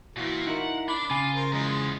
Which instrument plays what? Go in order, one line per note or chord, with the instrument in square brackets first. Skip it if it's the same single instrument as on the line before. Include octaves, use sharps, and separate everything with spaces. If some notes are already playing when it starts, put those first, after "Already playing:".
[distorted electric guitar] A#2 A#3 [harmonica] E3 F4 F#4
[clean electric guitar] D#4 E4 A#4 [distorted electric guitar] F#5
[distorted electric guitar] D4 [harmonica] B5 D6
[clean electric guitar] C#3 G#5 [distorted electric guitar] F4
[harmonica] A#4 C5
[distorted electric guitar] E2 [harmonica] F3 G#3